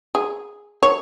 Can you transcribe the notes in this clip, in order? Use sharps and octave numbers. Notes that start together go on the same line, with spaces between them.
G#4
C#5